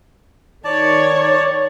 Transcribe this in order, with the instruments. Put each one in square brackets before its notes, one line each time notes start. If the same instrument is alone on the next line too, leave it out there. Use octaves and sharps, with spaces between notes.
[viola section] D#3 C#5 [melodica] D5 A5